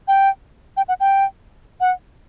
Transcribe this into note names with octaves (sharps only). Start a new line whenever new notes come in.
G5
G5
F#5
G5
F#5